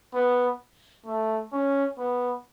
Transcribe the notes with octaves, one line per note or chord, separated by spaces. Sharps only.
B3
A3
C#4
B3